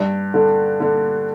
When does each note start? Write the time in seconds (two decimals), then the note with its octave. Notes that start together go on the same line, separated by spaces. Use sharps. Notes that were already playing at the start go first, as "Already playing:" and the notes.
Already playing: G2
0.34 D3
0.80 D3